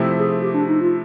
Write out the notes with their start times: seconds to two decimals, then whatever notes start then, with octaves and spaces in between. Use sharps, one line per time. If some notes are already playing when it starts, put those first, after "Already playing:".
Already playing: C3 F3 A3 C4 E4
0.17 G#4
0.42 G4
0.54 D4
0.68 D#4
0.81 F4